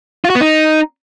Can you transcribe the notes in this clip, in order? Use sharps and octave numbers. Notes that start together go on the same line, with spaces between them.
F4
F#4
B3
D#4